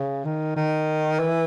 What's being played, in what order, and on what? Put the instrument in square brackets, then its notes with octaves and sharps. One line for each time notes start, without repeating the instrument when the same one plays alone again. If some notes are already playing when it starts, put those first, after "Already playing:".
Already playing: [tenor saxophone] C#3
D#3
D#3
E3